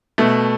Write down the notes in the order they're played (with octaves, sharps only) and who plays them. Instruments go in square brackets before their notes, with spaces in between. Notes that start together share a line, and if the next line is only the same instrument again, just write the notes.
[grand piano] B2 A3